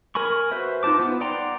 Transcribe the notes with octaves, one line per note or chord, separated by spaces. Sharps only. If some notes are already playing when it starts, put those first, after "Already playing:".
A#4 G#5 B5 C#6
F#4 B4 C5 E5
D#4 F4 C5 A5 D6
B3
D5 F#5 G5 A#5 C6